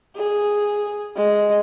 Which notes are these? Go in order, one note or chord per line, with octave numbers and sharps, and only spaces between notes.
G#4
G#3